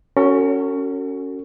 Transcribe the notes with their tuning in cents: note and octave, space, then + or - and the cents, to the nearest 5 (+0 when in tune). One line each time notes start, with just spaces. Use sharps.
C#4 +0 F#4 +10 A4 +45